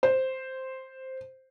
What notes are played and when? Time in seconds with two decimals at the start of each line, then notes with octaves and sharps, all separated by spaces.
0.03 C5